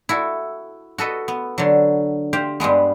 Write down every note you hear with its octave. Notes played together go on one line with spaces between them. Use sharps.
E4 F#4 A4
F#4 A4 B4 D#5
B3
D3 F#3
G4 C5 F5 G5
G2 G3 G#3 B3